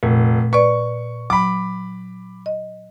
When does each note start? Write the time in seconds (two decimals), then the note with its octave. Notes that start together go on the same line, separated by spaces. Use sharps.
0.03 F1 A#2
0.53 B4 D5 C#6
1.30 F#3 B5 D6
2.46 D#5